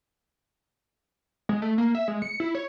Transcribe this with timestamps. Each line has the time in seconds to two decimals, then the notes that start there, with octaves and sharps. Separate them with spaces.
1.49 G#3
1.62 A3
1.78 A#3
1.95 E5
2.08 G#3
2.22 C#7
2.40 E4
2.55 C#5